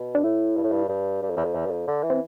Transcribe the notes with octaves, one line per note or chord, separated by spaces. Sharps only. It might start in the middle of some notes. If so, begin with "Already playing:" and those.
Already playing: B2
D4
A2 E4
G2
A2
G2
G2
G2
F2
E2
F2
E2
G2
F2
D3
E3
C4